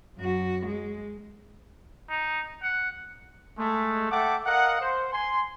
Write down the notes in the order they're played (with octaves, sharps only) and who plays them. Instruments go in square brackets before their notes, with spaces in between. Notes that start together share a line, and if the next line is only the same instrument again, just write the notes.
[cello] F#2 F#4
G#3
[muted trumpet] D#4
F#5
[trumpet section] G#3 A3
A4 E5 F#5 G5 D6
A#4 D#5 F5 F#5
C5
G#5 C6